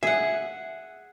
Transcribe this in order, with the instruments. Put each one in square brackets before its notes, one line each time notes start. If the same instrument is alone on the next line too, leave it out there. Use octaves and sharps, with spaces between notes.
[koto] G#4 F#5 [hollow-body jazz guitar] E5